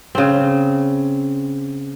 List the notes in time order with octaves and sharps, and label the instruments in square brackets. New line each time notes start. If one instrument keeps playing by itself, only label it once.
[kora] C#3 C4